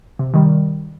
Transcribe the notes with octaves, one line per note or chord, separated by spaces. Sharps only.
C3
D#3 G3